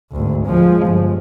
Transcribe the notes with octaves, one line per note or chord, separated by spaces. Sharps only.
G#1 D2
F3 G#3
G1